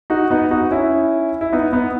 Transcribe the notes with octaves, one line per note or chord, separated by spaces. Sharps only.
D#4 F#4
B3 D#4
D#4 F#4
C#4 E4
E4
B3 D#4
B3 D#4